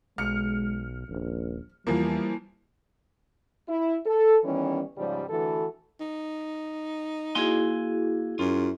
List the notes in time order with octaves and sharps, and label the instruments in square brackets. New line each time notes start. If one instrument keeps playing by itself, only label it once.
[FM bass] B1 [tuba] G#3 [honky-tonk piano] F6 C#7
[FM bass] D#1 [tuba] A#1
[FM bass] E2 [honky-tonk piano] E3 F3 A#3 [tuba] G3
[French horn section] E4
A4
D#3 E3 G3 B3 C#4
G#2 C#3 F3 G3
D3 E3 A3 F#4 A4 B4
[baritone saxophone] D#4
[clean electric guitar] A#3 G#5 C6 [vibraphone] E4 F#4 G#4
[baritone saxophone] F#2 [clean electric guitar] F4